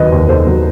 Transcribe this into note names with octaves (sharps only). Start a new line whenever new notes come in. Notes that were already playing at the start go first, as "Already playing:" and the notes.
Already playing: D#2 D#3 F#3 B4 D#5
D#2
D#2 A4 C5
F#3